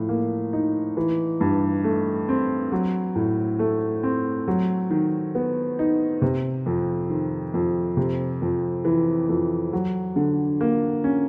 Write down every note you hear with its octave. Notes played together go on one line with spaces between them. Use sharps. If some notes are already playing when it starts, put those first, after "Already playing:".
Already playing: A2 F3
A#3
D#4
E3
G2
A3
C4
F#3
A2
A3
C4
F#3
D#3
B3
D#4
C3
F2
D#3
F2
C3
F2
E3
F2
F#3
D3
A#3
C#4